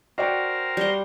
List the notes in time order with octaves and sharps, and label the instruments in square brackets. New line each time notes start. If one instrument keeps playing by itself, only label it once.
[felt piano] F#4 D5 G5 [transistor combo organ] A#4 C5 F5
[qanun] G3 C6